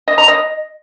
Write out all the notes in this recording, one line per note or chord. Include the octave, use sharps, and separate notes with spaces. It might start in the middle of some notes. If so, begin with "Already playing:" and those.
D#5
A#5
D#5